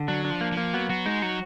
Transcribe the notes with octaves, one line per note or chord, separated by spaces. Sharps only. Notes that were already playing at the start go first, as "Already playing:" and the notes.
Already playing: D3
F#3 D4
D4
F3
A#3
F3
A#3
F#3 B3
F#3 F#4
G#3 D#4
F#3 F#4